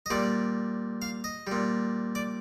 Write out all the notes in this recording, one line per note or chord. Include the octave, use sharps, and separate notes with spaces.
D#5
A#2 G3 D5
F5
D#5
A#2 G3
D5